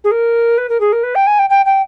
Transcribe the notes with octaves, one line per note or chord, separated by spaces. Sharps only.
G#4
A#4
B4
A#4
G#4
A#4
B4
G5
G#5
G5
G5
G5